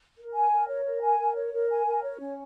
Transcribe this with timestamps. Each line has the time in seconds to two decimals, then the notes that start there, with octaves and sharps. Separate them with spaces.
0.18 A#4
0.34 G#5
0.52 A#4
0.68 C#5
0.85 A#4
1.02 G#5
1.19 A#4
1.35 C#5
1.53 A#4
1.70 G#5
1.86 A#4
2.02 C#5
2.20 C#4